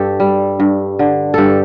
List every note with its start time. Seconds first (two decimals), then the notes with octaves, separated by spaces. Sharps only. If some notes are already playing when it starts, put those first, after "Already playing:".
Already playing: G2 G4 A4
0.20 G3
0.60 G2
0.99 D3
1.34 G2 G4 A4